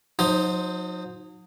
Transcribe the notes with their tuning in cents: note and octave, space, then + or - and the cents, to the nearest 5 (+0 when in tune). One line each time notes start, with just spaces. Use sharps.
F#3 -40 D#4 +0 C5 +0